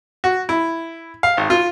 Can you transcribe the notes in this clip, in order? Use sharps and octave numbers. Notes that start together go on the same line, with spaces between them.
F#4
E4
F5
G#1
F4